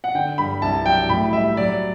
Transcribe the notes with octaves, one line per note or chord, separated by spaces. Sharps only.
F#5
D3 G5
G2 B5
C2 A5
F#3 G5
A2 B5
G3 E5
F#3 D5